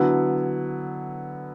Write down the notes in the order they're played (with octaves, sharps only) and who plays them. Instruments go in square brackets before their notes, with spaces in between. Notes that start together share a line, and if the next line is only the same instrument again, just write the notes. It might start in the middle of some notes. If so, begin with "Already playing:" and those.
Already playing: [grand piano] D3 F#3 B3 E4